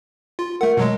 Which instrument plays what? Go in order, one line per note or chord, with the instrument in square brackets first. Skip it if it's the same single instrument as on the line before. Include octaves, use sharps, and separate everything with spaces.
[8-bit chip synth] F4
[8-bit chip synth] A3 F#5 [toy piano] A#4
[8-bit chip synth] B2 F#3 G#3